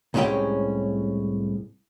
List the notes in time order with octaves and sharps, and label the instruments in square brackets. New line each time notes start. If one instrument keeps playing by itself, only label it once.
[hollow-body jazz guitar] C2 A2 G#3 C#4 G4 G5